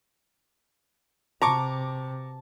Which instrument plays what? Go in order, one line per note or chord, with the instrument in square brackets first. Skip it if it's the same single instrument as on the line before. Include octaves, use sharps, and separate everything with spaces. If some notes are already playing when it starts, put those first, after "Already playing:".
[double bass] C3 [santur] A5 [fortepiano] A#5 C#6 D6